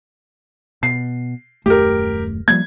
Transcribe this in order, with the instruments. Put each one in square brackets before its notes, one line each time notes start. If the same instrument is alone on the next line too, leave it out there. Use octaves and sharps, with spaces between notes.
[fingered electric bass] B2 [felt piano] C7
[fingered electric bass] D#1 F#2 A3 [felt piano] G4 A#4
[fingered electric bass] F3 G3 A#3 [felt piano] G#6